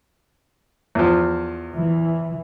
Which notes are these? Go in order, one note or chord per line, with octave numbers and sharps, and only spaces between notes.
E2 F3
E3